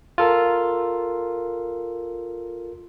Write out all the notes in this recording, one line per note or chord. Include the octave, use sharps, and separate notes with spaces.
F4 A4 A#4